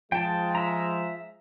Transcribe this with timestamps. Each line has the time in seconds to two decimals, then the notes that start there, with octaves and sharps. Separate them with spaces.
0.12 F3 G#3 G5 A5
0.55 E5 A#5